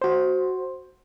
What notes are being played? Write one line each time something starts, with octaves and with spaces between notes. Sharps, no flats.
F#4 C5